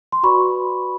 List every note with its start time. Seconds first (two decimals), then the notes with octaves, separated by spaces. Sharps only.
0.12 C6
0.23 F#4 B4 D5 B5 C#6